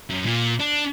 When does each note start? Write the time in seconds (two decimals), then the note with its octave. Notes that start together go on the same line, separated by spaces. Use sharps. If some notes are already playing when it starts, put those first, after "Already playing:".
0.10 F#2
0.25 A#2
0.60 D4